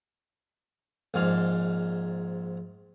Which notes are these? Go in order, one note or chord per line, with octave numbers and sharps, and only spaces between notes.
A#1 G#2 F5